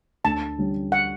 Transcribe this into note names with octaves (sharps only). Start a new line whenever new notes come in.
D2 A5
D3 G3 C#4
F#5